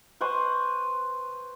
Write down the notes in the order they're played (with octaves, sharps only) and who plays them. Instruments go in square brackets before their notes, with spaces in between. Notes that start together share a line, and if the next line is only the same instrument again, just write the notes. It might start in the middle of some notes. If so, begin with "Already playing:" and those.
[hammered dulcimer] B4 C5 F#5 C#6